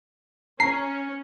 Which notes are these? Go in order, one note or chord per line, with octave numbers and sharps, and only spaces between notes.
C#4 A#5 C7